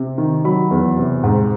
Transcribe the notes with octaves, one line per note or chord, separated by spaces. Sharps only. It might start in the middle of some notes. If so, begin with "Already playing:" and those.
Already playing: C3
D#3
F#3 B5
E2
C3
G#2